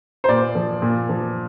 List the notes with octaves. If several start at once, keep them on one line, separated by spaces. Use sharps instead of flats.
C5
A#2 D5
F3
A#2
F3